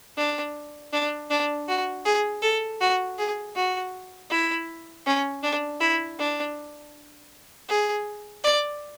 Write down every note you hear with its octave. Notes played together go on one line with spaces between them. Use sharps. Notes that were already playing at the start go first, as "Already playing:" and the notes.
D4
D4
D4
F#4
G#4
A4
F#4
G#4
F#4
E4
C#4
D4
E4
D4
G#4
D5